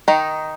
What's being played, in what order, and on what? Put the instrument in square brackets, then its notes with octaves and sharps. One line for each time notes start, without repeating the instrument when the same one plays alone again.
[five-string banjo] D#3 D#4